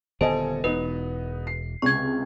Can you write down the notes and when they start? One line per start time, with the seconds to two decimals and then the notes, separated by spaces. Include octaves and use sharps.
0.21 D#1 D3 B3 A4 C5 D#5 G#5
0.64 E1 B3 D#4 B4
1.47 C7
1.82 C#2 C3 C#6 G#6